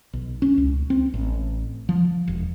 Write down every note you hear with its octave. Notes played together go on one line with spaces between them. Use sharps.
B1
C#4
C#2
C4
A1
F3
E1